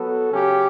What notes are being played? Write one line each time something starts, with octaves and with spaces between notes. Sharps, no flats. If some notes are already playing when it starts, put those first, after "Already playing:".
Already playing: F#3 B3 F#4 A4
C#3 F#3 C#4 G4